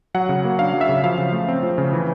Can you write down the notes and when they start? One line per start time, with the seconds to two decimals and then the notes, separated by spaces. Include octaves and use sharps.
0.14 F#3 F#5
0.29 C#3
0.45 A#3
0.59 D4 F5
0.74 F#3
0.81 E5
0.89 C#3
1.03 F3 F5
1.18 C#3
1.33 A3
1.48 C4
1.63 F3
1.78 C#3
1.93 E3